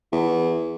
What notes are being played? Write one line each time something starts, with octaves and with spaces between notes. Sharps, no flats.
E2